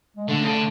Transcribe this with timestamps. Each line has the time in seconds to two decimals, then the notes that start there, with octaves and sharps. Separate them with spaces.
0.17 G#3
0.28 D3 A3
0.41 C#3
0.45 D3